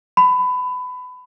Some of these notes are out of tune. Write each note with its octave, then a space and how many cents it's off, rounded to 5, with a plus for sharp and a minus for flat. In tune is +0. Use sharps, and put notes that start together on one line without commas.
B5 +25